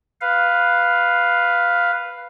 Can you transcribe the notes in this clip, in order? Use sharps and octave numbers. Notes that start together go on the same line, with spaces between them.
B4 F5